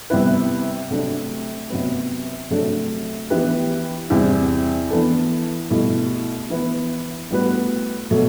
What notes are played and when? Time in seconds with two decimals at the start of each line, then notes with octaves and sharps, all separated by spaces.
0.10 C3 G3 B3 E4 B4
0.90 C3 F#3 A3 D4
1.70 C3 F#3 B3
2.50 C3 F#3 A3 D4
3.30 E3 B3 E4 G4 B4
4.10 E2 C3 G3 C4
4.90 E3 B3 D4 A4
5.70 C2 B2 A3 E4 G4
6.50 E3 B3 E4 B4
7.30 A2 G3 B3 F#4 B4
8.11 B2 F#3 A3